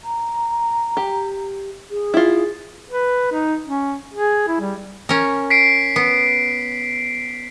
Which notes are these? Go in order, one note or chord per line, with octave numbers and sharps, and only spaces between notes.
A#5
G4
G#4
E4 F4
B4
D#4
C#4
G#4
E4
G3
C#4 A#4
B6 C7 D7
B3